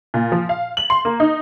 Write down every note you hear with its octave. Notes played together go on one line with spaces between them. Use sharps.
A#2
F3
F5
F#7
C6
A#3
D#4